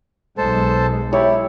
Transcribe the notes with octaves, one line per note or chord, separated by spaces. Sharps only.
B1 G#3 A4 C5 A5
E4 G4 C#5